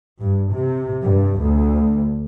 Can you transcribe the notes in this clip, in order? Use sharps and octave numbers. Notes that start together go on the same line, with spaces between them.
G2
C3
G2
D2